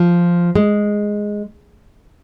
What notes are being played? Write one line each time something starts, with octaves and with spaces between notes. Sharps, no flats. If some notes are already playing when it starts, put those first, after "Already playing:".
Already playing: F3
G#3